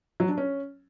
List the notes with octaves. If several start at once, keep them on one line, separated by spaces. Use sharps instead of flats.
F#3
D4
C#4